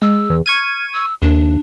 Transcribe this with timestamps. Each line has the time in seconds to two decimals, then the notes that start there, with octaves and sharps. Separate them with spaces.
0.02 G#3 E6
0.30 E2
0.46 C#6 F6 G#6 D#7
0.93 E6
1.22 D#2 D4